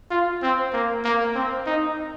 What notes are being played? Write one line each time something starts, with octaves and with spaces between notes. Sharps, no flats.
F4
C4
A#3
A#3
C4
D#4